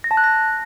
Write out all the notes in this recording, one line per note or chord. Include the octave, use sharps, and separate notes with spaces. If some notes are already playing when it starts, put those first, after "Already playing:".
A#6
A5
F#6
A#6